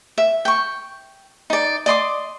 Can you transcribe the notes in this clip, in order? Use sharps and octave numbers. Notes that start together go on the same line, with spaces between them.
E5
G5 C#6
D#4 D5
D5 D#5 C6 D6